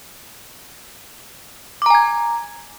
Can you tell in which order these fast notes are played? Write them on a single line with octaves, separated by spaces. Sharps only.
D6 A#5 G#5 G#6